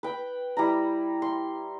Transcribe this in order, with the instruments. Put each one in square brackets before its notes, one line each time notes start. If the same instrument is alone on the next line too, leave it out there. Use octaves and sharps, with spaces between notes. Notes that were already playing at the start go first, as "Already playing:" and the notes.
[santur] B4 G5
G3 E4 A#5
C6